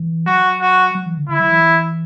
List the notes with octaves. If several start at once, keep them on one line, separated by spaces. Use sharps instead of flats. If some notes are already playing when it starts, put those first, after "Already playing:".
Already playing: E3
F#3 F#4
F#4
F#3
E3
D3
D3 E4
F#3
E3